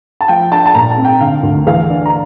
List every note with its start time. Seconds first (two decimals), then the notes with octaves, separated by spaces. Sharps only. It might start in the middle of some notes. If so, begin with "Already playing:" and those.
0.21 A5
0.28 F3 G5
0.51 D4 A5
0.66 A5
0.75 A#2 A#5
0.90 A5
0.97 C4
1.05 G5
1.20 D3 F5
1.43 D2
1.67 E3 F5
1.90 D4
2.06 A#5